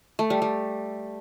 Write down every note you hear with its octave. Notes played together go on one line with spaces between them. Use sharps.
A3
G3
G3